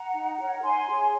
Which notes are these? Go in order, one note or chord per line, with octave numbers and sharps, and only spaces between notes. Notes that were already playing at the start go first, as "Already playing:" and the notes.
Already playing: F#5 A#5
D#4
A#4 C#5
D#4 G#5 C6
G#4 C#5